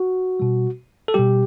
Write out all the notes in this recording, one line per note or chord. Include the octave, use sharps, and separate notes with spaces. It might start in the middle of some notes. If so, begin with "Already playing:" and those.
Already playing: F#4
B2 G3
A4
B2 G3 G4